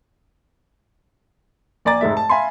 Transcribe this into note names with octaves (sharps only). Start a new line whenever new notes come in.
A#1 D5 G#5 A#5 D6 A6
F1 G#2 G#3 E5
A5
E5 F5 G#5 B5 C6